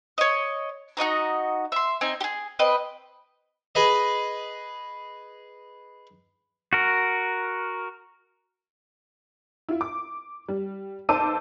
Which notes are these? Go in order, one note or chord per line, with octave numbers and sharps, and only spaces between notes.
C#5 D#5
D#4 F#4 D#5 A#5
E5 C6
C4 D#4 G#5
G4 G#4
C4 B4 D#5 G5
G#4 B4 D#5
F#4 A#4
E4 F4
D6
G3
B1 C5 A5 D6 E6 D#7